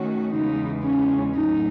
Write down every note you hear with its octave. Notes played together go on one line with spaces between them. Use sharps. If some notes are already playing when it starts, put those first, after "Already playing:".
Already playing: D#3 A3 C#4 F#4
E2 C#3 E3 G#3 D#4
C#4
A2 F#3 A3 D#4